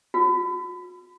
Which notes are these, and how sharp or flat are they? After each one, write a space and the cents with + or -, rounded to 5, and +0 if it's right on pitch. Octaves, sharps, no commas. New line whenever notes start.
F#4 -45